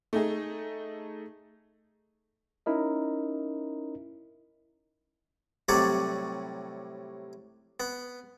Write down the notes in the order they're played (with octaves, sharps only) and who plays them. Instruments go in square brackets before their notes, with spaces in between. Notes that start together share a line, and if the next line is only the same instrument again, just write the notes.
[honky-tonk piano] A3 D#4 G#4
[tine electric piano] C#4 D#4 E4 A#4 D#5
[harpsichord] A2 C3 F#3 G3 C#5 D5
B3